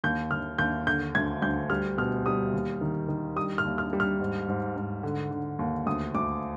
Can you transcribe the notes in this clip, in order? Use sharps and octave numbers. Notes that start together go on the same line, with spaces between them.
D#2 G6
D#2 F6
D#2 G6
D3 G6
D2 G#6
D2 G6
G3 F6
B2 F6
G3 D#6
D#2
D#3
D#3
G3 D#6
F6
D#2
F6
G3
F6
G#2
G#2
G#2
D3
D3
D#2
D2 D#6
D2 D6